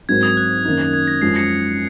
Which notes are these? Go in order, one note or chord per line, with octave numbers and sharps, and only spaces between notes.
G#2 F#3 C4 F#4 A#4 G#6
D#6
F#6
F#2 D#3 A#3 D#4
G#6
A#6
F#2 F3 G#3 C7
A#6 C#7